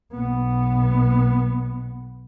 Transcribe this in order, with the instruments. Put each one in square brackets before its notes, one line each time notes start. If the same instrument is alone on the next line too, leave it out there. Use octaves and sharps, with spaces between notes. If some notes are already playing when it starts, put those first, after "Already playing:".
[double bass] B1 B3